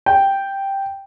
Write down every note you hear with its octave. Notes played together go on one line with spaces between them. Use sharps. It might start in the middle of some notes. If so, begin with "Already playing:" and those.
G5